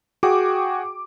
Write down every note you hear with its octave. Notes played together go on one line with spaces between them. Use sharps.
F#4 G#4 G5 D6